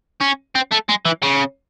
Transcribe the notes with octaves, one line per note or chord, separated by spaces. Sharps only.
C#4
C4
A3
G#3
E3
C#3